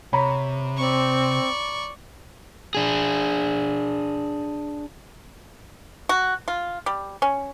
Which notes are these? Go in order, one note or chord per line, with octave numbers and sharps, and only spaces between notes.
C3 C#5 A#5 B5
C4 D5 C#6
D4 G#4
F#4
F4
G3
C#4